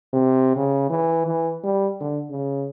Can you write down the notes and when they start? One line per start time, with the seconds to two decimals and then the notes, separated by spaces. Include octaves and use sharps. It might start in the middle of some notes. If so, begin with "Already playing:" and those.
0.13 C3
0.56 C#3
0.90 E3
1.27 E3
1.64 G3
2.00 D3
2.30 C#3